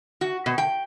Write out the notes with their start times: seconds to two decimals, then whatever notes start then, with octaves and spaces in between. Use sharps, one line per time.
0.21 F#4
0.46 B2
0.58 G5